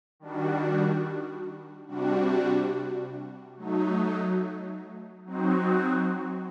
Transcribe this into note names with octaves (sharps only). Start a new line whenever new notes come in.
D#3 G3 D4 F#4
C3 G3 D4 F#4
F#3 A3 D#4
F#3 C4 D#4 F#4